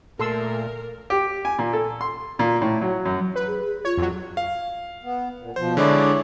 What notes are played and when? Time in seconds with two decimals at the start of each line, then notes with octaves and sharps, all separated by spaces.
0.19 A#2 A3 A4 A#4 C6 E6
1.10 G4
1.45 G#5
1.59 A#2
1.73 A4
2.01 C6
2.39 A#2
2.62 A2
2.81 F#3
3.06 F#2
3.36 B4
3.47 G#4
3.66 G#4
3.85 F4 C#5
3.97 F2 F#3
4.37 F5
5.04 B3
5.40 A#2
5.56 B2 F3 C5
5.77 D3 G#3 D4 E4 C#5 D5